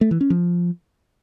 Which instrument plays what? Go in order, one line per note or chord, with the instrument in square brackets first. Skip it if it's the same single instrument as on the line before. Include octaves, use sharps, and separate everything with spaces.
[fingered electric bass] A3
E3
C#4
F3